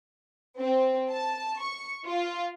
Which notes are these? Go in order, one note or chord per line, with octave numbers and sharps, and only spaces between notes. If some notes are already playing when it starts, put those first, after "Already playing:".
C4
A5
C#6
F4